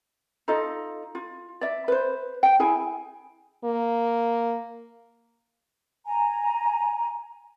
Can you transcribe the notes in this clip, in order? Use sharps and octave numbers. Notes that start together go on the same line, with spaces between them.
D#4 F4 A4 D#5
F4
D5 E5
B4 C5
G5
E4 G#4 G#5
A#3
G#5 A#5